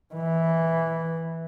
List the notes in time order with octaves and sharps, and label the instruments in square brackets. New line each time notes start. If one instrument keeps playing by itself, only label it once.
[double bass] E3